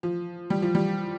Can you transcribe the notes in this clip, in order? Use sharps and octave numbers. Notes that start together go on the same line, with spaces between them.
F3
G3
F3
G3